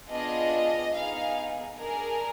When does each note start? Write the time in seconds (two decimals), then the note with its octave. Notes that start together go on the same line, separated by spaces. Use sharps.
0.12 B3 D4 F4 G#4 D#5
0.95 B3 D#4 G#4 F5
1.79 D4 G#4 A#4